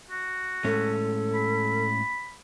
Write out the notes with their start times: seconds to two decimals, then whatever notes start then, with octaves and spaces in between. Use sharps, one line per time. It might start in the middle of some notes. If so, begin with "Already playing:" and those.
0.11 F#4
0.64 A2 G#3 C#4 A4
1.34 B5